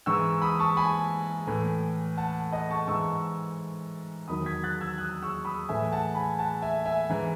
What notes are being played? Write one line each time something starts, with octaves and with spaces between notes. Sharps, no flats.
G#2 E3 C#6 E6
B5 D#6
A5 C#6
G#5 B5
A2 E3
F#5 A5
D#5 F#5
A5 C#6
G#2 E3 C#6 E6
E2 D#3 F#3 B5 D#6
G#6 B6
F#6 A6
E6 G#6
D#6 F#6
C#6 E6
B5 D#6
A2 E3 E5 G#5
F#5 A5
G#5 B5
F#5 A5
E5 G#5
E5 G#5
G#2 E3